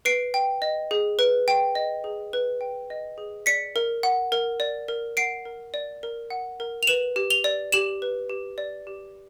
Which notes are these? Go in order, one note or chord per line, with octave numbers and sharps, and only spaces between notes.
B4 C7 D7
G5
D#5
G#4
B4
G5
D#5
G#4
B4
G5
D#5
G#4
D5 B6 C#7
A#4
F#5
A#4
D5
A#4
F#5 C7 D7
A#4
D5
A#4
F#5
A#4
F7
B4 E7 F#7
G4
F7 G7
D5
G4 E7 F#7
B4
G4
D5
G4